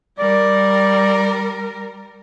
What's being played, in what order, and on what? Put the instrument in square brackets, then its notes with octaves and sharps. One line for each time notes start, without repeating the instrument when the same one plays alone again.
[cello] G3 A#4 [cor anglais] D5